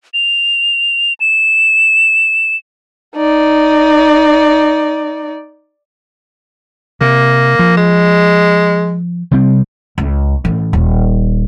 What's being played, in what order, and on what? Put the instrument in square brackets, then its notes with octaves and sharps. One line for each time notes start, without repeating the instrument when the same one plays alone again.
[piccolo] F7
E7
[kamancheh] D#4 D5
[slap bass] C3 [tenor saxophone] A#3
[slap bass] F3
[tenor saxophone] G#3
[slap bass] C3 G3 C4
[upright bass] C#2
A1
D#1